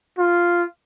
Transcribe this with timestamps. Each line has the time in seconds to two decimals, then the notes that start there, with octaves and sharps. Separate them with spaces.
0.18 F4